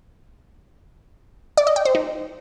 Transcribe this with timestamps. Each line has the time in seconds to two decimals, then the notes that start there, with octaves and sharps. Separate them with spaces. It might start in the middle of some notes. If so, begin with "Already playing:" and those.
1.57 D5
1.67 D#5
1.76 G5
1.85 C5
1.95 D#4